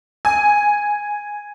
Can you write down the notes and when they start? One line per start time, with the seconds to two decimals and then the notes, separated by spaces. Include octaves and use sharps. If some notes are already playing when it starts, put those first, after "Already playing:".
0.25 G#5